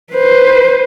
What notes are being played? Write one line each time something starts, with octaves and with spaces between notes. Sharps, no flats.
B4 C5